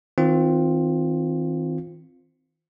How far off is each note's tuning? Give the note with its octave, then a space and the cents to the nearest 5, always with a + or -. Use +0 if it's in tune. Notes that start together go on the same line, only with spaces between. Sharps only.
D#3 +40 C4 +0 F4 +10